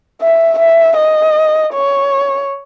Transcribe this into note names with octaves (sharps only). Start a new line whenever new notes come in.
E5
E5
D#5
C#5